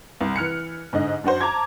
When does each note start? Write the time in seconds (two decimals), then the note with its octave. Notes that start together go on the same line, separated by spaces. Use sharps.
0.21 C2
0.36 E3 F6 F#6 C#7
0.93 G#2 D3 D#5
1.24 F#2 D4 F#4 C5
1.41 A5 A#5 D6 G#6